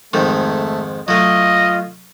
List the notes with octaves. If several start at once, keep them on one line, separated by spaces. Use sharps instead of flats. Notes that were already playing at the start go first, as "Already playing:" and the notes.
F2 G#2 D#3 A3
F#3 A3 F4 D#5